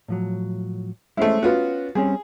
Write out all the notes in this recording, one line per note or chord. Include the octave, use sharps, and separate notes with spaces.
A2 F3 F#3
G#3 A3 C#4 E4 C5
B3 C#4 F4 F#4
G3 C4 C#4 G#4